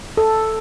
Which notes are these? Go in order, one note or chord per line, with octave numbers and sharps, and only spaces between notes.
A4